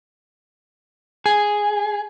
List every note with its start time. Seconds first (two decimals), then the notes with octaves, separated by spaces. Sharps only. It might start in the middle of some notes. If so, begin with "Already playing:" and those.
1.26 G#4